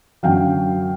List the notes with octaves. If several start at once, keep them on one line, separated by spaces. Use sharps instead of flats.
F#2 D3 F#3 F5 G5